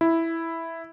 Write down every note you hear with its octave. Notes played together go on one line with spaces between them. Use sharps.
E4